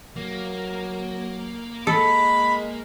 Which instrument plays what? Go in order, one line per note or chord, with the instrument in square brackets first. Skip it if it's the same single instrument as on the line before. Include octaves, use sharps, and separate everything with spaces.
[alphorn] F#3 [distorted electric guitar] A#3
[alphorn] G#3 [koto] A4 [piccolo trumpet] B5